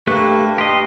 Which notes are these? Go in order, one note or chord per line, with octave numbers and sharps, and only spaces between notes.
G2 A3 A#3 G4 C#6 F#6
G4 D#5 C6